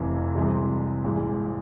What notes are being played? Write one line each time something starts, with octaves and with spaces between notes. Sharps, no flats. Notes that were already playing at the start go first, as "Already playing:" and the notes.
Already playing: F1 F2 C3 E3
C2 C3 E3 G#3 C4
A#1 G#2 E3 G#3